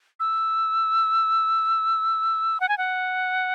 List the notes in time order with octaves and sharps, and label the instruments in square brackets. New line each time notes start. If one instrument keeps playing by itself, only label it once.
[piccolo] E6
F#5
G#5
F#5